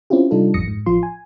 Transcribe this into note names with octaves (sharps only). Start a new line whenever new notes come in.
C4 C#4 E4 F4 G4
C3 G3 D4 D#4 F4 A4
A1 F2 D#6 A#6 C#7
G#2
A1 F3 F4 C6
G#5